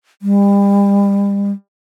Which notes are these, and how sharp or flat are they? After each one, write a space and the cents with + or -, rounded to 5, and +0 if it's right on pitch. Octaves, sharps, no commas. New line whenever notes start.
G3 +35